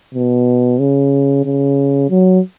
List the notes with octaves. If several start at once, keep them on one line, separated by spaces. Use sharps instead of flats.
B2
C#3
C#3
F#3